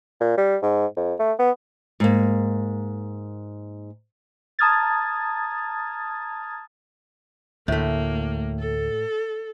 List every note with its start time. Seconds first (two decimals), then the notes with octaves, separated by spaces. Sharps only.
0.20 A#2
0.37 G3
0.62 G#2
0.97 F2
1.19 A3
1.39 B3
2.00 G#2 A#3
4.59 A5 A#5 D#6 F6 G#6 A6
7.68 D2 A2 A3 A#3
8.60 A4